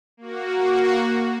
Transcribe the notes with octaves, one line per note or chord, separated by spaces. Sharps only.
A#3 F#4